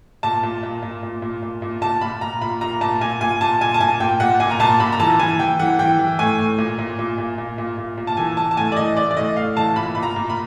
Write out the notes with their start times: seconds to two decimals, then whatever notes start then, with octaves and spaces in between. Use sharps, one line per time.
0.23 A#2 A5
0.43 A#2
0.63 A#2
0.82 A#2
1.03 A#2
1.22 A#2
1.43 A#2
1.62 A#2
1.81 A#2 A5
2.01 A#2 B5
2.21 A#2 A#5
2.41 A#2 B5
2.61 A#2 A#5
2.81 A#2 A5
3.01 A#2 G#5
3.21 A#2 G#5
3.41 A#2 A5
3.61 A#2 G#5
3.74 A5
3.80 A#2 G#5
4.00 A#2 G5
4.20 A#2 F#5
4.40 A#2 G#5
4.51 A#5
4.60 A#2 A5
4.80 A#2 B5
4.92 A#5
5.00 E3 A5
5.19 E3 G#5
5.39 E3 G5
5.59 E3 F#5
5.79 E3 G5
5.99 E3
6.19 A2 G#5
6.38 A2
6.58 A#2
6.79 A#2
6.99 A#2
7.18 A#2
7.38 A#2
7.58 A#2
7.77 A#2
7.98 A#2
8.07 A5
8.17 E3 G#5
8.37 E3 A5
8.51 A5
8.57 A2 G#5
8.72 D5
8.77 E3 D#5
8.97 E3 D5
9.11 D5
9.17 A2 D#5
9.37 A2 F5
9.56 E3 A5
9.76 A#2 B5
9.95 A#2 B5
10.03 A#5
10.16 A#2
10.30 B5